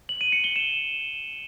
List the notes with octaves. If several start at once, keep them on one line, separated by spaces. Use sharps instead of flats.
F#7
D#7
C#7
G7
E7